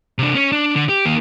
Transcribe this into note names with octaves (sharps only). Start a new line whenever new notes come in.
C3 D4
C#4 C#5
D4
D3
G4
D#3 A#3